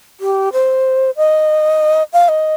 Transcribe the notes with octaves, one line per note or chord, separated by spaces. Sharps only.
G4
C5
D#5
F5
D#5